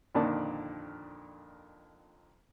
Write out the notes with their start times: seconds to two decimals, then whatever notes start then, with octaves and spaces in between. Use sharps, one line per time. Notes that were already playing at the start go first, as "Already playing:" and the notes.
0.15 F2 A#2 D3 D#3 D5 A5